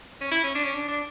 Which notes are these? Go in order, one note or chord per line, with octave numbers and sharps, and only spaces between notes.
C#4
E4
C#4
D4
C#4
D4
D4